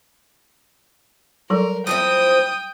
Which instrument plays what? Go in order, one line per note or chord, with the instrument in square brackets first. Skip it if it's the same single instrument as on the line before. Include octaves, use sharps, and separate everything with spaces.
[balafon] F#3 G3 A4 [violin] A#4
[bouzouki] F3 C4 E4 [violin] G5 [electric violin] D#6